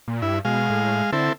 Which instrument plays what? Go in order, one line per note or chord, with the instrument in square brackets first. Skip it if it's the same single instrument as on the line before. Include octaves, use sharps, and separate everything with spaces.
[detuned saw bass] A#2
[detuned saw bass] G2 [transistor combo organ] E4
[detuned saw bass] B2 [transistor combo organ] G#3 F5
[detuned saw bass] A2
[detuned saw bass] D3 [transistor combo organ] C4 E4 A4